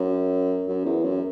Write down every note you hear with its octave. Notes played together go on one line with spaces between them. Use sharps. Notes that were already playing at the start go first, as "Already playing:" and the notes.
Already playing: F#2
F#2
E2
F#2